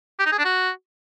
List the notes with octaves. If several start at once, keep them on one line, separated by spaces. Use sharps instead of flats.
G4
D#4
G#4
D4
F#4